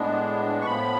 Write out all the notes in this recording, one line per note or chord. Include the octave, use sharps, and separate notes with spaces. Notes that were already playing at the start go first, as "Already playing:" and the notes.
Already playing: A2 G#3 B3 D4
C#6
A2 F3 B3 B5